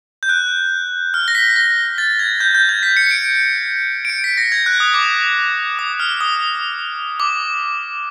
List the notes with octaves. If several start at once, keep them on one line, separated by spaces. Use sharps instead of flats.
G6
F#6
F6
A#6
B6
B6
A#6
A6
G#6
G6
G6
G#6
B6
C#7
C#7
D7
D7
C#7
B6
A#6
G#6
F#6
D#6
D6
D#6
F6
D#6
D6